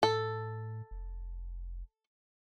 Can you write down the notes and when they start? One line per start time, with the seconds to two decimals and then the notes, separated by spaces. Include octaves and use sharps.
0.03 A2 A4
0.91 F1